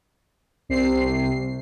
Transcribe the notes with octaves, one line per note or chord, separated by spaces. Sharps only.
C2 C3 C7